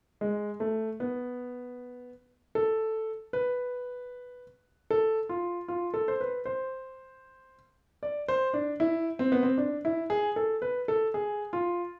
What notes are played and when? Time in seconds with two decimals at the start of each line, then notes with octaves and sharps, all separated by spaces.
0.21 G#3
0.60 A3
1.00 B3
2.55 A4
3.33 B4
4.91 A4
5.29 F4
5.68 F4
5.94 A4
6.08 C5
6.21 B4
6.46 C5
8.03 D5
8.28 C5
8.53 D4
8.80 E4
9.19 C4
9.32 B3
9.43 C4
9.58 D4
9.85 E4
10.10 G#4
10.36 A4
10.62 B4
10.88 A4
11.14 G#4
11.53 F4